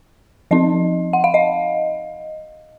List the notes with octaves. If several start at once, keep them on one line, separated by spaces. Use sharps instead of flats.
F3 C4 D#4 D#5
F#5
F5
D#5